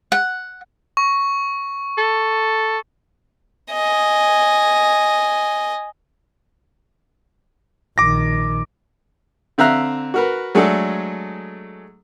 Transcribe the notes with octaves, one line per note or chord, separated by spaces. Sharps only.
F#5
C#6
A4
D#5 G#5
A#1 D#3 D6 A#6
D3 C4 E5 F5 A#5 F#6
F#4 A#4 B4
F#3 G#3 A3 D4 G#4 A4